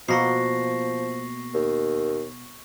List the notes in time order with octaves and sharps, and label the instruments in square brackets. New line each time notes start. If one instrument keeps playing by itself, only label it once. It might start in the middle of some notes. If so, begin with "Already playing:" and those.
[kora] B2 A#3 F#5 [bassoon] F3 [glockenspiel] C#6 A#6 C7
[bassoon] D#2